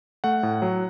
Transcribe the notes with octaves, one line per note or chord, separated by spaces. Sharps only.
A3 F#5
A2
F#3